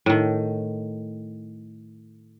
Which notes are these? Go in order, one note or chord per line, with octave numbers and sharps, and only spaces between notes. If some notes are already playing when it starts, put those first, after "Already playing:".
A2 D#3